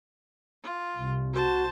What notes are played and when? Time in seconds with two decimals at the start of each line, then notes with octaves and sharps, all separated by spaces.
0.63 F4
0.98 C2
1.33 F#4 C5 A5